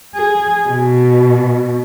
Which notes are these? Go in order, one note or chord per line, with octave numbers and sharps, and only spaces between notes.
G#4
B2